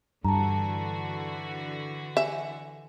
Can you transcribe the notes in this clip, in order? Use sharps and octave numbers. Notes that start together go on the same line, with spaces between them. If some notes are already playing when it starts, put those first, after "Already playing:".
G2 D3 E3 F#4 A5 A#5
E5 G#5